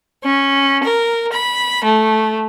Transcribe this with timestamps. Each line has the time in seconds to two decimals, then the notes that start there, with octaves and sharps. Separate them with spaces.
0.23 C#4
0.83 A#4
1.31 B5
1.84 A3